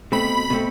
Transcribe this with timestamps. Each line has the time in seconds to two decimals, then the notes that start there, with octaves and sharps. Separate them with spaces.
0.12 B2 A3 C4 B5
0.50 B2 A3 C4